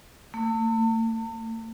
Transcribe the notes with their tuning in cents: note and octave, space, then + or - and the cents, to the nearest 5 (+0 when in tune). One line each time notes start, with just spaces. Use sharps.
A3 +40
A3 +45